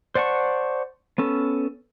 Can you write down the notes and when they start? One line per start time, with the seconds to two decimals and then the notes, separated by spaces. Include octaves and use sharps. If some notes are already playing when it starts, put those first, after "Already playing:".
0.15 C5 D5 F#5 A5 C#6
1.18 B3 C#4 A4